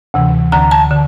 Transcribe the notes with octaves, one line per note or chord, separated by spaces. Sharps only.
D2 C3 E3
D2 D3 A#5
A5
D3